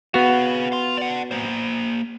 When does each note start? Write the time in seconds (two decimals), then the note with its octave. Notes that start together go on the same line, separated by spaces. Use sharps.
0.14 B3 F#4 G#4 F5
0.72 F5 C6
0.97 D5 F#5
1.31 A#3 C5